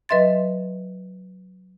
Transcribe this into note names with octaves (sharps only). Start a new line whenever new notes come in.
F#3 B4 D#5 E5 C6 A6